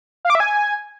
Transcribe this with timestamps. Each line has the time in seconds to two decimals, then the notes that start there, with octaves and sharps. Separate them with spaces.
0.25 F5
0.30 D6
0.35 E5
0.40 G#5